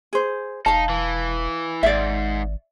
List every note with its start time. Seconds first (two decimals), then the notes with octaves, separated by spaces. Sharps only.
0.13 G#4 C5
0.66 E1 D#4 F5 A5
0.89 E3
1.83 G#1 G#2 D5 E5